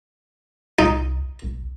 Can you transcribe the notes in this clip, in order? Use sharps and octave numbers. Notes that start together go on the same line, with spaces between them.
C2 D#4
B1